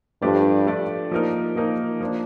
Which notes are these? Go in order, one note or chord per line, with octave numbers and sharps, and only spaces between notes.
G2 F3 A3 D4 G4 D5
F3 A3 D4 G4 D5
F3 A#3 D#4 A#4
F3 A#3 D#4 A#4
F3 A#3 D4